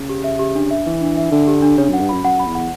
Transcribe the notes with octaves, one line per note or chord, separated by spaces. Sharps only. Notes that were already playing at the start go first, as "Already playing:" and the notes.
Already playing: C#3
G4
E5
G4
D4
E5
E3 E5
D4
E5
D3 D4
G4
D4
C#3 C#5
F#2 F#5
G2
F#2 B5
F#2 F#5
B5
E2
F#5